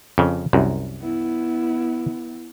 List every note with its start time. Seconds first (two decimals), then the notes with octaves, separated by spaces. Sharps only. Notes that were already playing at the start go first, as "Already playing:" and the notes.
0.18 F2 C#3
0.53 C2 F#2
1.01 B3 E4